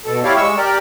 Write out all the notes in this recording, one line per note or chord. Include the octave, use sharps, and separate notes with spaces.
B2 A4
E4 G4 C#5 D5 F5
G#3 C#6 E6
G4 A#4 D5